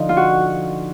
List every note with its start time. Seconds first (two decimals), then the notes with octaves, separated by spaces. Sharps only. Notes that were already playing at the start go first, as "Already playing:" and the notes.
Already playing: D3 F3 D#4
0.09 F4
0.17 F#4